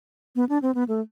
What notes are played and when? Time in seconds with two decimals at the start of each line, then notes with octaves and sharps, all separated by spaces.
0.36 B3
0.49 D4
0.62 C4
0.75 B3
0.88 A3